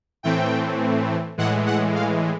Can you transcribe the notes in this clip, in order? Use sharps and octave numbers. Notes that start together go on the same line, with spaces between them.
A2 E3 A3 C4 G5
A2 E3 G#3 F#5
F#5
F5